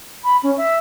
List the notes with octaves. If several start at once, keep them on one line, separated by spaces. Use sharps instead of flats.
B5
C#4
E5